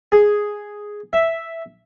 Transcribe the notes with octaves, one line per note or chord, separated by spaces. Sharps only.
G#4
E5